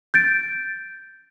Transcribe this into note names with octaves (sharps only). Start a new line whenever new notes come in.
G6 A6 D7